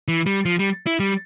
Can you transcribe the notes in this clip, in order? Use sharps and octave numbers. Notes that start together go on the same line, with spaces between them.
E3
G3
F3
G3
E4
G3